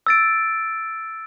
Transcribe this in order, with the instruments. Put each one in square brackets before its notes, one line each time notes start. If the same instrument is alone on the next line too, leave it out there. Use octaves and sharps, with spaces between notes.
[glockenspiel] E6 A6 D7